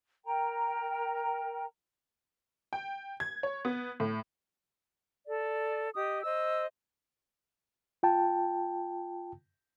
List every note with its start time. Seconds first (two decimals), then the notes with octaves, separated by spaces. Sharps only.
0.25 A#4 G5 A#5
2.73 G5
3.20 G#6
3.43 C#5
3.65 B3
4.00 A2
5.27 A4 D5
5.95 G4 D#5 D#6
6.23 C5 D#5 E6
8.03 F4 G5 A5